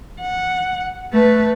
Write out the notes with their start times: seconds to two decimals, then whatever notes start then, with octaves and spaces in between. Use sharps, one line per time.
0.21 F#5
1.13 A3 B4